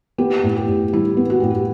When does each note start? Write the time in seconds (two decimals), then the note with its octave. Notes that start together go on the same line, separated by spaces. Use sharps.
0.18 B3 G4
0.43 A2
0.56 G4
0.68 A2
0.93 G3 E4
1.17 B3
1.30 F#4
1.40 A2 G4
1.50 F#4